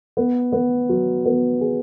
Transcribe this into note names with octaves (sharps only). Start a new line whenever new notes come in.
B3
B3
F#3
B3
G#4